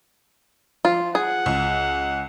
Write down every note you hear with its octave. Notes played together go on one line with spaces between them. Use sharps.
F3 F4
G#4 F#5
C#2